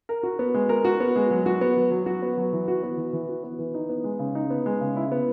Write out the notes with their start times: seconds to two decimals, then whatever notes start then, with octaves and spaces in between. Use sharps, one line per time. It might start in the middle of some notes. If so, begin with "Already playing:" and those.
0.09 A#4
0.23 F#4
0.39 B3
0.54 G#3
0.69 A#4
0.85 F#4
1.00 B3
1.16 G#3
1.30 F#3
1.46 F#4
1.61 B3
1.77 F#3
1.91 F#3
2.06 F#4
2.22 B3
2.37 F#3
2.52 E3
2.68 F#4
2.83 B3
2.97 E3
3.13 E3
3.29 F#4
3.44 B3
3.59 E3
3.74 D#4
3.89 B3
4.04 G#3
4.19 C#3
4.35 D#4
4.50 B3
4.66 G#3
4.81 C#3
4.96 E4
5.12 B3